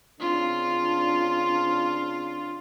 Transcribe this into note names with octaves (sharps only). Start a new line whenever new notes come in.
C#3 C4 D4 F4